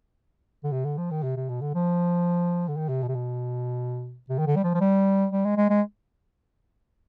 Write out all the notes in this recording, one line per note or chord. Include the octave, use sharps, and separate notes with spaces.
D3
C3
D3
F3
D#3
C3
C3
B2
D3
F3
D3
D#3
C3
B2
C3
B2
C3
D#3
D3
G3
F3
F3
G3
G3
G#3
G#3
G#3